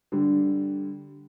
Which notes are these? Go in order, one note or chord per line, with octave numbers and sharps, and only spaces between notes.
D3 G3